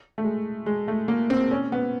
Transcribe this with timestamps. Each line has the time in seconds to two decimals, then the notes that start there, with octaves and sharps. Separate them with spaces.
0.18 A3
0.24 G#3
0.66 G#3
0.88 A3
1.08 A#3
1.30 C4
1.51 C#4
1.72 B3